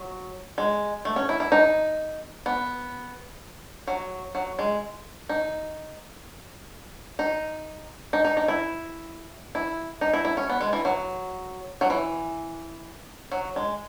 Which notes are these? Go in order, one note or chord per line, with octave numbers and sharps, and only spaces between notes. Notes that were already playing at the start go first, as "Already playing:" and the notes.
Already playing: F#3
G#3
A3
C#4
E4
E4
D#4
B3
F#3
F#3
G#3
D#4
D#4
D#4
D#4
D#4
E4
E4
D#4
E4
E4
C#4
B3
G#3
E3
F#3
F#3
E3
F#3
G#3